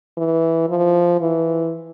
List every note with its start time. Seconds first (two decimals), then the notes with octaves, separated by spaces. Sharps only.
0.18 E3
0.69 F3
1.21 E3